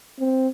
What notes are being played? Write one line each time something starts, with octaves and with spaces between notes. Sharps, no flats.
C4